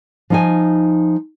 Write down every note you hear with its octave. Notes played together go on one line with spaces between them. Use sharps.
F3 D#4 G#5